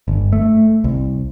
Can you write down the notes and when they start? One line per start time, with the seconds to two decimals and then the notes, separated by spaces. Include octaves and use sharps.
0.08 G1
0.33 A3
0.84 C2